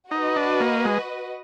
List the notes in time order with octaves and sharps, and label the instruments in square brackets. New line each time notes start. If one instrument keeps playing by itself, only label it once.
[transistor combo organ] D#4 [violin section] F#4 B4 D#5
[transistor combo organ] D4
A#3
G#3